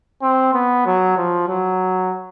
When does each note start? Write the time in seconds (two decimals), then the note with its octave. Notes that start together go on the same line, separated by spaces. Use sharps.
0.22 C4
0.54 B3
0.86 F#3
1.17 F3
1.48 F#3